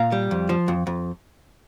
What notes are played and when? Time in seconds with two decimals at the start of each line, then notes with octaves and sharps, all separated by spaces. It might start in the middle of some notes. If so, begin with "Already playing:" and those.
Already playing: A#2 F5 A#5
0.12 G3
0.31 F2
0.49 F3
0.68 F2
0.87 F2